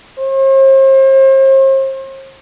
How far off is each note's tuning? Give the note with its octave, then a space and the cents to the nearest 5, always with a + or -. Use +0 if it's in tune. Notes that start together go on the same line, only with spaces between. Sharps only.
C5 +40